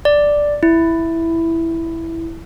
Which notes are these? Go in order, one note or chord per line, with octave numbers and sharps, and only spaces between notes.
D5
E4